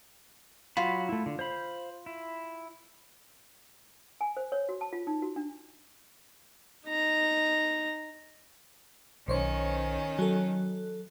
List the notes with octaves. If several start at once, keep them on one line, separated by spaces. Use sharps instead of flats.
F#3 F4 F#4 B5
A3 E4
D3
C5 F5 B5
E4
G#5
C5
C#5
F#4
A5
F4
D#4
F#4
D4
D#4 A#5
B1 D#3 C#4 C5 C#5
F#3 A4